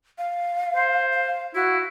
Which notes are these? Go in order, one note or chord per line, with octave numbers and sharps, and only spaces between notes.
F5
C5
F5
E4 F#4